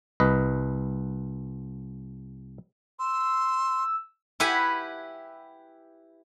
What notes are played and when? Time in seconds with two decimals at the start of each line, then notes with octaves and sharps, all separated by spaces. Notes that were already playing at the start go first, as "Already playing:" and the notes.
0.20 C2 B4 D#5
2.99 C6 E6
4.40 E4 G4 B4 F#5 G#5 B5